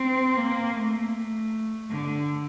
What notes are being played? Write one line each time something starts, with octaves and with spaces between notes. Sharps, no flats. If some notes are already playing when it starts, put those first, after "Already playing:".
Already playing: C4
A#3
A3
D3